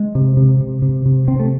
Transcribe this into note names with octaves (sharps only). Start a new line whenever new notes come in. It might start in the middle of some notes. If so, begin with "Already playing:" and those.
Already playing: G#3
C3
C3
C3
C3
C3
C3 C4
A3